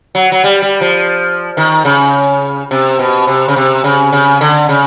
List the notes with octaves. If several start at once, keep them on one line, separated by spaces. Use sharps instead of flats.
F#3
F#3
G3
G3
F3
D#3
C#3
C3
B2
C3
C#3
C3
C#3
C#3
D3
C#3